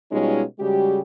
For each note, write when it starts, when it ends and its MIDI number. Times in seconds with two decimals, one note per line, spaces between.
0.12 0.42 47
0.12 0.42 55
0.12 0.42 56
0.12 0.42 61
0.12 0.42 63
0.12 0.42 65
0.59 1.00 49
0.59 1.00 55
0.59 1.00 56
0.59 1.00 66
0.59 1.00 67